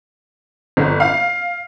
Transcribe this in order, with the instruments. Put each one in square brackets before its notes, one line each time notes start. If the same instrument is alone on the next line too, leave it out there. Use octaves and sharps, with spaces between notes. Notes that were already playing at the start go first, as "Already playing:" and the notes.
[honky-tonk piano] G1
F5